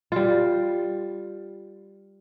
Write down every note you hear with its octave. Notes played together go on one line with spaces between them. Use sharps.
G3 F4